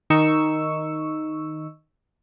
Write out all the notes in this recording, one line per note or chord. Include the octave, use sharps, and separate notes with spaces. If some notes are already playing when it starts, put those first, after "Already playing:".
D#3 D#4 C#6 E6